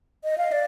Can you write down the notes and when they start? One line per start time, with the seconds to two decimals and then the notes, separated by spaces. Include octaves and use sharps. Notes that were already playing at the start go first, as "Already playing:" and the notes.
0.24 D#5
0.38 F5
0.52 D5